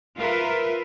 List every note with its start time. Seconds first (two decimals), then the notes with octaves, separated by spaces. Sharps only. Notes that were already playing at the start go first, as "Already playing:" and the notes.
0.18 F4 A#4 B4 E5